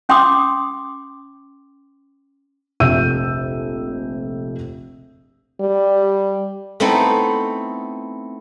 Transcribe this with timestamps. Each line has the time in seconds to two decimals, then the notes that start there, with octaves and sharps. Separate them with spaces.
0.09 C#4 G5 C6 D6 D#6
2.80 F1 A#1 E5 E6 G6 D#7
5.61 G3
6.80 A3 B3 C4 D#4 E4